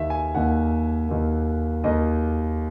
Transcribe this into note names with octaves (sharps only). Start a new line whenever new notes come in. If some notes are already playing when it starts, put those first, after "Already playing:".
Already playing: D#2 D#3 A#3 E5
G#5
D#2 D#3 A#3 F#5
D#2 D#3 A#3
D#2 D#3 A#3 D#5